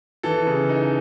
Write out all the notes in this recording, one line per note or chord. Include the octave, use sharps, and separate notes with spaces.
E3 A4
C#3
D#4